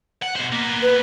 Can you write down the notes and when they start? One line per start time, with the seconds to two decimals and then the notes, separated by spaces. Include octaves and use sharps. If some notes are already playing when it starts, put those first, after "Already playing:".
0.22 F#5
0.36 B2 C5
0.52 A#3 B3
0.82 B4